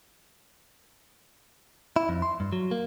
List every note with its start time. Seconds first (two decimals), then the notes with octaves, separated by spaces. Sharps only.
1.96 E4
2.09 F2
2.22 C6
2.40 G2
2.53 F#3
2.71 A#3